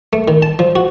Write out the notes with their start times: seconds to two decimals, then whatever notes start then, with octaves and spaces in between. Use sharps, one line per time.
0.13 A3
0.28 D#3
0.42 A5
0.59 F3
0.76 F#4